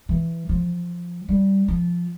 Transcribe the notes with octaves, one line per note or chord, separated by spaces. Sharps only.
E3
F3
G3
F3